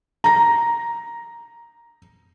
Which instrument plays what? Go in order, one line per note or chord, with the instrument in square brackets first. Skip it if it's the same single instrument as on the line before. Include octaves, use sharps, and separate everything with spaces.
[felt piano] A#5 A#6